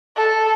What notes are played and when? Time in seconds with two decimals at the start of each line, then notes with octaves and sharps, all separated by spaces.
0.16 A4